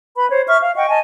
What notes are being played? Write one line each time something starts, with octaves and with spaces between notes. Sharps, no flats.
B4 B5
C5 C#5
E5 C#6 F6
F5
D#5 F#5 G5 C#6
D#5 G#5 A5